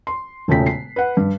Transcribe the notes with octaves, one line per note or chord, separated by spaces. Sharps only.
C6
E1 A#2 C#3 A3 G5 B6
C7
B4 F#5
G2